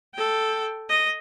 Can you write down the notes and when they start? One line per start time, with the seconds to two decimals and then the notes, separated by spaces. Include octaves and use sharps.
0.14 A4 G5
0.89 D#5